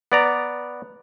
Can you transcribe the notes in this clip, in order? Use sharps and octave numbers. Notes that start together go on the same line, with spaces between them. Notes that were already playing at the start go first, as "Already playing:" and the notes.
B3 D5 A#5